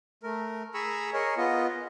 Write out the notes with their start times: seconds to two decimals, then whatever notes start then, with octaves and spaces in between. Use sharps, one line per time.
0.23 A3 A#4
0.74 G#4 G#5 A#5 B5 C#6 E6
1.13 G#4 A#4 C#5 D#5
1.37 B3 F4 D#5